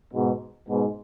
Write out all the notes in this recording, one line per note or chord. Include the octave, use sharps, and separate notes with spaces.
G#2 B2
G#2 B2